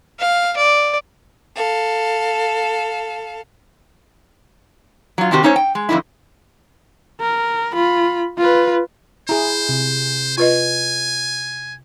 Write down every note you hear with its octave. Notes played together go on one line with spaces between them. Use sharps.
F5
D5
A4 F5
F#3 F4
C3 D#3 C4 F#4 G4
A3 C#4 D#4 C5 C#5
G5
G#3
F2 A2 D3 D#4 E4
A#4
F4 B5
F4 B4
E4 G#4 C5 A#5
C3
F4 B4 D#5 G#5